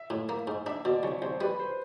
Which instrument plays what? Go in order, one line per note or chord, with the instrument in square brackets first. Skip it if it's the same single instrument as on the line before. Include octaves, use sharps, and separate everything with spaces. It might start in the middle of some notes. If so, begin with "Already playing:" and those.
Already playing: [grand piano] E5
[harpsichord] A2
A#3
G#2
[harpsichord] D4 [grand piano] E5
[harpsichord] B2 [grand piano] D5
[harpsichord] C2 [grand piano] C#5
[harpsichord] C2 [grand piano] C5
[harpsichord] G3 [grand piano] B4
[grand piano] C5